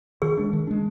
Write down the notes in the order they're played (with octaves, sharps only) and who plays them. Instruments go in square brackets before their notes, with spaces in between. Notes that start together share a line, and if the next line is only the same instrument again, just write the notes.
[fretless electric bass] D#3 [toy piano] G#4
[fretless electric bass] G#3 D4
D#3
G#3 D4